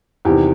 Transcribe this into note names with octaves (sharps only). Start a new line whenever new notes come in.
E2 C3 D#3 G4